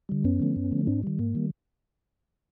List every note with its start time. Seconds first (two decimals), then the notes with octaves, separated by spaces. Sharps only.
0.09 D3 G3
0.24 F#2 B3 C#4
0.40 D3 F3 A3
0.56 F#2
0.71 D3 F3 A3
0.87 G#2 C4 D4
1.03 D#3 G3
1.19 G#2 A#3
1.35 D#3 G3